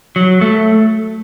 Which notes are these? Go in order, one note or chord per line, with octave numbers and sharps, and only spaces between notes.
F#3
A3